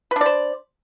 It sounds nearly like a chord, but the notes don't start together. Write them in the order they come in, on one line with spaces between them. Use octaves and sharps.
B4 D4 D5 C5